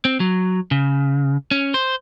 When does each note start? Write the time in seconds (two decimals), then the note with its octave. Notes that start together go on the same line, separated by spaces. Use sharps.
0.05 C4
0.20 F#3
0.71 C#3
1.51 C#4
1.74 C5